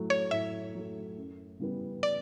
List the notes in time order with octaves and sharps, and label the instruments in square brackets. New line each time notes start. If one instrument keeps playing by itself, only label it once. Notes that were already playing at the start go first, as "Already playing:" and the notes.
Already playing: [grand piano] A2 F#3 A3
[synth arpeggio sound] C#5
[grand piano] A2 [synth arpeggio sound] E5
[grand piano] F#3 A3
F#2
C#3 E3 G3 B3
[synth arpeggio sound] D5